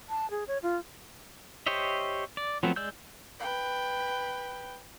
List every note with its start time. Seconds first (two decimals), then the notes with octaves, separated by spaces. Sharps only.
0.09 A5
0.31 G#4
0.48 C#5
0.63 F4
1.67 G4 C5 C#5 D#5 E5
2.37 D5
2.63 F3 F#3 A3 B3 C4
2.76 G#3 D5 E6 G6
3.39 B4 G5